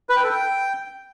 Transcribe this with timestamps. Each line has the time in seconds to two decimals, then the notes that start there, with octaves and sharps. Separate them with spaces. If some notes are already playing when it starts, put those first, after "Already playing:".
0.09 B4
0.16 G5
0.24 A4
0.31 G5